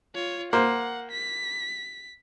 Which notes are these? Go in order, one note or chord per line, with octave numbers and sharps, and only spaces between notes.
F4 C#5
A#3 C5 F#5
B6